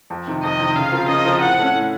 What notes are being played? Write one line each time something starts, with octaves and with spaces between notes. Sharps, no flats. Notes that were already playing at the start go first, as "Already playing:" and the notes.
F2
C3 D#3
F2 D#5
C3 D#3
C#3 F5
F3 C4 F4 A#4
C#3 D#5
F3 C4 F4 A#4
A2 F#5
A3 C#4
A2